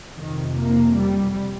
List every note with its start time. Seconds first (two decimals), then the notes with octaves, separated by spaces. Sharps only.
0.17 F2 C3 D#3
0.57 A#3
0.97 G3